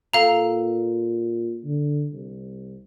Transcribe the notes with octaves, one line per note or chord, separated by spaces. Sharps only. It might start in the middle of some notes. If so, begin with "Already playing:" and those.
A#2 A4 F5 A#5
D3
C2